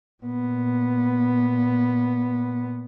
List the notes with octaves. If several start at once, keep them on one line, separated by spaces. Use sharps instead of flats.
A#2 B3